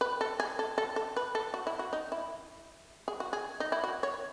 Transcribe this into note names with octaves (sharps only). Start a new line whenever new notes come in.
B4
A4
G#4
A4
A4
A4
B4
A4
F#4
E4
F#4
D#4
E4
G#4
F#4
G#4
D#4
E4
F#4
C#5